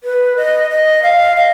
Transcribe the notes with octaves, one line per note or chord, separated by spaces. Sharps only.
B4
D#5
D#5
F5
D#5